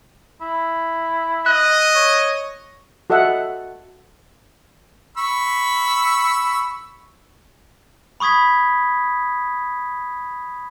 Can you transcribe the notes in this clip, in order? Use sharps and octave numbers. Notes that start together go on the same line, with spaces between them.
E4
D#5 F#6
C#5
F#4 A4 D#5 E5 F#5
B5 C#6 E6
B5 C#6 D#6 G#6 B6